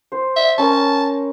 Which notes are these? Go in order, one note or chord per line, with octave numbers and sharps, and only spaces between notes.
C5
E5
C#4 A#4 A5